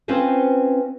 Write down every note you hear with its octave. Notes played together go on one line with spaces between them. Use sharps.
C4 C#4 F4 B4 C5